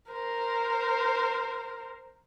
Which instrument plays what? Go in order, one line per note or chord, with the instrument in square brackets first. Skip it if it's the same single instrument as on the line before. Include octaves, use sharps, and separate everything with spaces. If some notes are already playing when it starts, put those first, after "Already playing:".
[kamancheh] A#4 C5